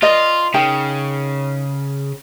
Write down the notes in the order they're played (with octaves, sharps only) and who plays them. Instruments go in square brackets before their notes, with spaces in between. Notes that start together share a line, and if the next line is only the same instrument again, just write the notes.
[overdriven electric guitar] F4 [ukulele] A#4 D5 D#5
[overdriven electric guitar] C#3 [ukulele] D#4 A#4 G5